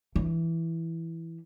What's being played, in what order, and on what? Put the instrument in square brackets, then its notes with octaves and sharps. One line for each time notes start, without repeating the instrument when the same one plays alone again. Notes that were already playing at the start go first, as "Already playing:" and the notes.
[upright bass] E3